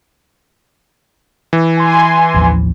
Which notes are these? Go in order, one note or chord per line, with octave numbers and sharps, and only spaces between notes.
E3
G#5 C6
A1 D#2 F3